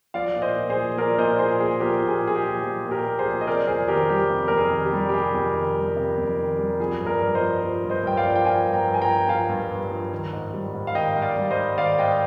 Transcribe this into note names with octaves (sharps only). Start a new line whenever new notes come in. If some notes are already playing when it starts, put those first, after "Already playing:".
F3 D5 F5
A#2
C5 D#5
A#2
G#4 C5
F3
F3 A#4 D5
A#2 C5 D#5
A#2 G#4 C5
F3 G#4
F3 G4 A#4
A#2
G#4
A#2 G#4
G4
F3
F3
A#2
G4 A#4
A#2
G#4 C5
F3
D#5
C3 A#4 D5
F2 G#4 C5
D#3 G4 A#4
G3 G4
C3
F2 A#4
G#4
D#3
G4
G3
G4
C3 G#4
F2
D#3
G3
C3
F2
D#3
G3
F3 G#4
G2
A#4 D5
G2
C5 D#5
F3
F3
G2
C5 D#5
G2 G5
D5 F5
F3
G5
F3 F5 G#5
G2
G5 A#5
G2
G#5
G5 A#5
F3
F3 F5 G#5
G2
G2
F3
D#3
G#2
G3
G#2
F5
D#3 D#5 G5
G#2
D5 F5
G3
C5 D#5
G#2
D#3 D5 F5
G#2 D#5 G5